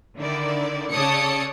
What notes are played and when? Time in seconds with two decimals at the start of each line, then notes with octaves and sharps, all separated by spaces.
0.17 D3 D#3 E4 D5
0.91 C#3 A4 C#5 D5 D#6 C#7